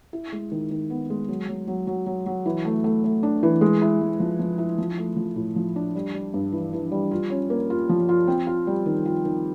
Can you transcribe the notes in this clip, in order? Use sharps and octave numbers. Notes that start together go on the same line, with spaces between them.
E4
G#3
D#3
D#3
B3
G#3
F#3
F#3
F#3
F#3
F#3
F#3
E3
A3
A3
A3
D4
E3
G#3
E4
G#3
F3
F3
E4
F3
A3
F3
A2
F3
D4
G3
G3
G2
E3
E3
G3
F4
C#4
A#3
F4
F3
F4
C4
F4
G3
D#3
F4
D#3